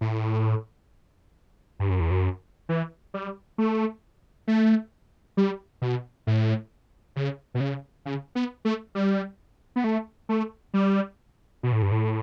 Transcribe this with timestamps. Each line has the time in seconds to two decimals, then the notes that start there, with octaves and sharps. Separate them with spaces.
0.01 A2
1.80 G2
1.90 F#2
2.00 E2
2.11 F#2
2.69 E3
3.14 G3
3.58 A3
4.47 A3
5.37 G3
5.82 B2
6.27 A2
7.16 C#3
7.55 B2
7.60 C#3
8.06 C#3
8.35 B3
8.65 A3
8.95 G3
9.76 B3
9.84 A3
10.29 A3
10.74 G3
11.63 B2
11.72 A2
11.82 G2
11.92 A2